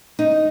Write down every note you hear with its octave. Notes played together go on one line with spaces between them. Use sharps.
D#4